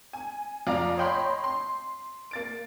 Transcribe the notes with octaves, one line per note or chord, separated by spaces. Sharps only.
G#5
F2 F4 D5 F5 A#5
C#5 D#5 G5 B5 C6
C6
A#3 A6 D7